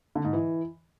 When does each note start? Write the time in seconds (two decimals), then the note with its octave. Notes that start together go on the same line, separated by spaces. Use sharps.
0.15 D3
0.24 G#2
0.33 E3